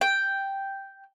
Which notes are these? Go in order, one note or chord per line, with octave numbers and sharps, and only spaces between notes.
G5